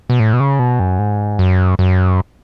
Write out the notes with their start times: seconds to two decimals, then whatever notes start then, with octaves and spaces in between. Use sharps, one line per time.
0.10 B2
0.20 A2
0.33 B2
0.40 C#3
0.59 B2
0.80 F#2
0.99 G#2
1.39 F#2
1.79 F#2